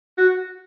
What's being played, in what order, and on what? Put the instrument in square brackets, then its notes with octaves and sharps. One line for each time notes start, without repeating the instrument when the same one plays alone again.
[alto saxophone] F#4